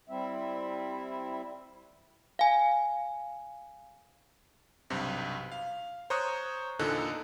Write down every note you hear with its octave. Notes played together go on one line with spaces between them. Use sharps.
G3 C4 E4 E5
F5 G#5
B1 G2 C3
F5
C5 C#5 A#5 C#6 D#6 F#6
E2 A#2 D3 D#4 A4 F#6